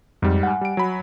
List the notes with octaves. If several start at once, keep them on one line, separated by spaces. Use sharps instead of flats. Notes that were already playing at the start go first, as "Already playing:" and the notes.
F2 G#2 G3
F#5 G#5
G3 D7
F#3 B5